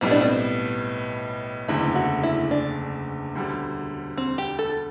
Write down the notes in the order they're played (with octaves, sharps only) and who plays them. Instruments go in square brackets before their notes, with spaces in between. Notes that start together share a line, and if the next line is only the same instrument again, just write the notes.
[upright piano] B1 A2 G3 B3 [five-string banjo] C4
[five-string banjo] D4
C4
[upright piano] F#1 E2 D3 A3 [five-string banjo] E4
[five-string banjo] F#4
E4
D4
[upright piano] E1 D2 D3 G3
[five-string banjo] C4
G4
A4